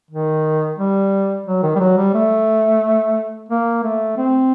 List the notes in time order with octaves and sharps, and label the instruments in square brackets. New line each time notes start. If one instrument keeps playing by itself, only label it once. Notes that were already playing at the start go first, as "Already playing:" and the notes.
[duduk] D#3
G3
F#3
D#3
G3
F#3
G3
A3
A#3
A3
C4